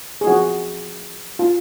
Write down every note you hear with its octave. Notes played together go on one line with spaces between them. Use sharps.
G#4
F3 C4 F#4
F4